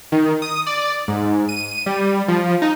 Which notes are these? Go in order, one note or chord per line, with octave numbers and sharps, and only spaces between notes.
D#3
D#6
D5
G#2
D#7
G3
F3
D#4